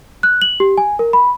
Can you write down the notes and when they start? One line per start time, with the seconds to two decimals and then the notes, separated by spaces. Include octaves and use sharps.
0.23 F#6
0.42 F#7
0.60 G4
0.78 G#5
0.99 A#4
1.13 B5